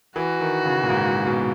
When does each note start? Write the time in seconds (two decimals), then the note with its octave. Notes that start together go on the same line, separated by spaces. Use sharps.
0.16 E3 F#4
0.41 D#3
0.65 C#3
0.83 A#2
0.90 G#2
1.27 B2